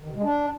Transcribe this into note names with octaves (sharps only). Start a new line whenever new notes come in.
D#3
C3
G#3
D4